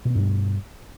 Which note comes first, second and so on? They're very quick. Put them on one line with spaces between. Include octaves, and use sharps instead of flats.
B2 B3 G2 G3